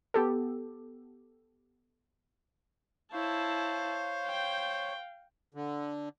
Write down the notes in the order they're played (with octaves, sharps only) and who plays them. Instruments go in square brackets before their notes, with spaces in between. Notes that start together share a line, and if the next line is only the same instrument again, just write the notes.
[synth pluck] B3 G4 A4
[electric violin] E4 A5 [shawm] C5 [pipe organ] C#5 [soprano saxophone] F5
[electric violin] G5
[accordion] D3